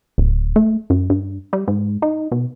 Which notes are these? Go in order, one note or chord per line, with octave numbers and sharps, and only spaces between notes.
D1
A3
F#2
G2
G3
G#2
D#4
B2